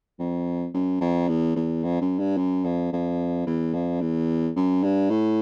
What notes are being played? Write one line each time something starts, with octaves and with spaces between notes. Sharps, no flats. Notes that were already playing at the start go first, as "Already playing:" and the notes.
F2
F#2
F2
E2
E2
F2
F#2
G2
F#2
F2
F2
E2
F2
E2
F#2
G2
A2